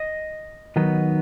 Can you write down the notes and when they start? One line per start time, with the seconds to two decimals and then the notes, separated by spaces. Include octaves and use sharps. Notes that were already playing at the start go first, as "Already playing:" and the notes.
Already playing: D#5
0.76 D#3 F#3 B3 D#4